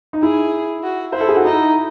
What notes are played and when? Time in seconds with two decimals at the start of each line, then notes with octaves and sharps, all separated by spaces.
0.13 D#4
0.22 E4 G#4
0.83 F#4
1.12 E4 C5
1.21 A4
1.28 G#4
1.36 F#4
1.44 D#4 E4